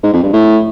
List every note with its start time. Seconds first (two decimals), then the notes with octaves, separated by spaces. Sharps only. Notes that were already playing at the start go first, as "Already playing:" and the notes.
0.03 G#2
0.13 F2
0.23 G2
0.33 A2